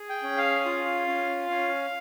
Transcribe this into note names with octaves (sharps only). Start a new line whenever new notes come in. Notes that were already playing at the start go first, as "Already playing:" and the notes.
Already playing: G#4
G5
C#4
F5
F4
C#4
C#4